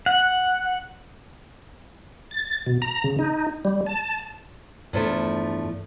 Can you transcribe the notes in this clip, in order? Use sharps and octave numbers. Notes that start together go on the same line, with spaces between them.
F#5
A6
B2
A#5
C#3
D#4
G3
A5
E2 G2 F3 A3